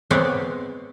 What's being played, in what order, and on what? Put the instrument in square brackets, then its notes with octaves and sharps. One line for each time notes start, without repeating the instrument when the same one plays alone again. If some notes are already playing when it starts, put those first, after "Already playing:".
[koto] G#3 B3 C4 C#5 D5 F#5